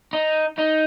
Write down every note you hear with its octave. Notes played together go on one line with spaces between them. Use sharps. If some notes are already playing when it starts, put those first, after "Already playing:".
D#4
D#4